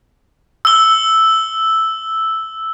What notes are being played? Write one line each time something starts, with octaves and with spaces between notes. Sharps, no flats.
E6 G7